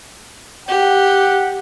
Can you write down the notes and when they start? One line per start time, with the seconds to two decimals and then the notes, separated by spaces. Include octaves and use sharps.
0.68 G4 F#5